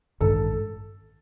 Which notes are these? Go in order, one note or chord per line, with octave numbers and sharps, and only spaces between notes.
A1 G2 D#3 G#3 A4